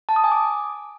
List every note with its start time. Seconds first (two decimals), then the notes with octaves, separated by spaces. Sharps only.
0.09 A5
0.16 D#6
0.24 G#5
0.32 D6